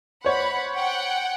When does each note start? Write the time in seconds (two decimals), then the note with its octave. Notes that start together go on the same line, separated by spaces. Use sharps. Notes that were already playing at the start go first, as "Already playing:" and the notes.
0.25 C5 C#5 F#5 B5
0.74 F#5 G5